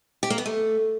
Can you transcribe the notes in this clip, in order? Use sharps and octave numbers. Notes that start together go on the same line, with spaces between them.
G4
A#3
B3
A3